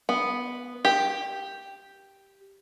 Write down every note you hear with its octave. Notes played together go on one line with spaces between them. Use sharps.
B3
G4